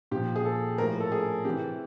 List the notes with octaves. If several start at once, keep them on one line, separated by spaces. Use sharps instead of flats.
A#2 F3 G4
G#4
A4
A2 F3 A#4
A4
G#4
C3 E3 G4